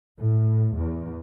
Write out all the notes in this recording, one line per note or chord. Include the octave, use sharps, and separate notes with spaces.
A2
E2